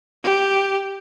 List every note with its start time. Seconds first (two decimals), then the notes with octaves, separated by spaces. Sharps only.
0.24 G4